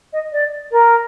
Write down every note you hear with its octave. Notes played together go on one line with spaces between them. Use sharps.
D#5
D5
A#4